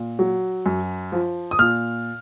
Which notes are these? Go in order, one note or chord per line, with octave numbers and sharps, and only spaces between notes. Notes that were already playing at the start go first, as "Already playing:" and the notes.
Already playing: A#2
F#3
F#2
F3
D#6
A#2 F6